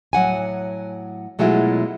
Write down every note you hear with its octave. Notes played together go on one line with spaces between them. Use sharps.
A2 F#3 F#5 G#5
B2 F#3 G#3 A3 E4 F4